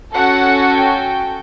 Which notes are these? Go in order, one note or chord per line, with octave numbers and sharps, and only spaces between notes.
C#4 F#4 A4 F#5
G5